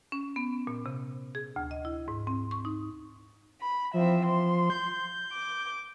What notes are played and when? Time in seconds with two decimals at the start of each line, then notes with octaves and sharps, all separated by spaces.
0.12 C#4
0.36 B3
0.67 A#2
0.86 C3
1.35 G#4
1.56 D2
1.71 D#5
1.85 E4
2.08 G#2
2.27 C4
2.51 C#6
2.65 D#4
3.60 B5
3.94 E3 F3 C4 E5
4.26 C6
4.70 G6
5.32 D6